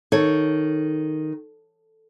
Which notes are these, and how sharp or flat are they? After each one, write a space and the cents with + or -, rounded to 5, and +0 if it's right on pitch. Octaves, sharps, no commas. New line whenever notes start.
D#3 +0 A4 +0 C#5 +0